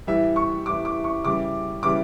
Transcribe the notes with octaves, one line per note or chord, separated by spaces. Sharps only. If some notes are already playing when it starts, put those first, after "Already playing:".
A2 E3 G3 E5
C#6
A2 E3 G3 D6
D6
C#6
C#3 E3 G3 D6
C#3 E3 G3 D6